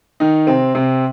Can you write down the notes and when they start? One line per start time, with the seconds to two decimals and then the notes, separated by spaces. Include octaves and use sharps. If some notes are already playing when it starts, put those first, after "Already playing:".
0.20 D#3 D#4
0.47 C3 C4
0.75 C3 C4